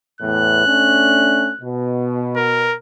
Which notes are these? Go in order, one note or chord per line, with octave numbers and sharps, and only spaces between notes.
E2 A2 F#6
A3 C#4 D4
B2
A#4